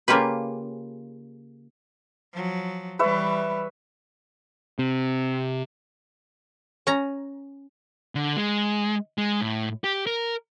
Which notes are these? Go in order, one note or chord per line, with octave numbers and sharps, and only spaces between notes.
C#3 A#3 F4 G4 B4
F3 F#3
E3 G3 B4 C#5 E5
C3
C#4 A#5
D3
G#3
G#3
A2
G4
A#4